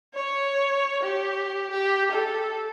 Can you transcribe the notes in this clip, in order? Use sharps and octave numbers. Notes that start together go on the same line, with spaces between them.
C#5
G4
G4
A4